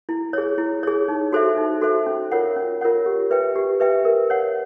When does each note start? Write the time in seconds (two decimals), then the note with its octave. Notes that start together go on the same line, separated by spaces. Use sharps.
0.09 E4
0.33 G#4 C#5
0.58 E4
0.83 G#4 C#5
1.08 D#4
1.32 F#4 A4 C5 E5
1.57 D#4
1.81 F#4 A4 C5 E5
2.06 C#4
2.32 F4 A#4 C#5 F#5
2.56 C#4
2.81 F4 A#4 C#5 F#5
3.06 G4
3.31 B4 E5 G5
3.55 G4
3.80 B4 E5 G5
4.05 A#4
4.30 C#5 F#5